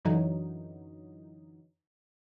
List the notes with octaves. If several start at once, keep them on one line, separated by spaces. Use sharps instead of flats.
F#2 D3 E3 F#3 D#4